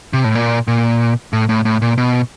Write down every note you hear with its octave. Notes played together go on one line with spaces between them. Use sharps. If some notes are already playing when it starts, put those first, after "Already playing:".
C3
A2
A#2
A#2
A2
A2
A2
A#2
B2